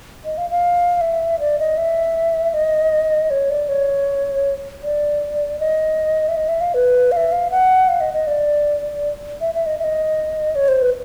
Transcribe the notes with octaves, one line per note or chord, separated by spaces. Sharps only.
D#5
F5
F5
E5
D5
D#5
E5
D#5
C#5
D5
C#5
D5
D#5
E5
D#5
E5
F5
B4
F5
E5
F5
F#5
F5
D#5
D#5
D5
E5
E5
D#5
E5
D#5
C#5
C5
B4